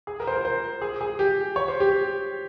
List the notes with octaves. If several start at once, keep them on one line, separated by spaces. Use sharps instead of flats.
G#4
A#4
C5
A#4
C5
G#4
G#4
G4
C#5
C5
G4